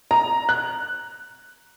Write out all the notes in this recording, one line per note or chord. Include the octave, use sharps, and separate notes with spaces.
A#5
F#6